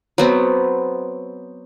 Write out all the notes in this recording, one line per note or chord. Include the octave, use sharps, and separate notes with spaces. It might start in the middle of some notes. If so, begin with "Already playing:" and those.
F#3 B3 C4